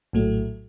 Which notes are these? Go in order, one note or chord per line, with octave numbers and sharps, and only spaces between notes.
A#1 A2 F#3 A3